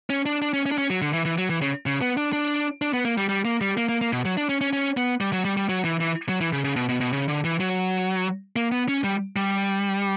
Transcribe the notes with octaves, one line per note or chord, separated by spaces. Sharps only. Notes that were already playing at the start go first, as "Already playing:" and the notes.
C#4
D4
D4
C#4
C#4
D4
C#4
F#3
D3
E3
E3
F#3
E3
C#3
C#3
B3
D4
D4
D4
B3
A#3
G3
G3
A#3
G3
A#3
A#3
A#3
B2
F#3
D4
C#4
C#4
C#4
B3
G3
F#3
G3
G3
F#3
E3
E3
F#3
E3
C#3
C#3
B2
B2
B2
C#3
D3
E3
F#3
A#3
B3
C#4
G3
G3